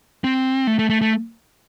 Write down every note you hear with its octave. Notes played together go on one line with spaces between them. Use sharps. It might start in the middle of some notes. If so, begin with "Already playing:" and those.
C4
A3
A3
A3
A3